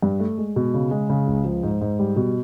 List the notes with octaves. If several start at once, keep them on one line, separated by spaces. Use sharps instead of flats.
G2
A3
G#3
B2
C#3
G#3
C#3
C#2
F3
G#2
G#2
G3
B2